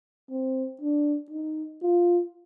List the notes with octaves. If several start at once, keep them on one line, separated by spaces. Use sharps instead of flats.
C4
D4
D#4
F4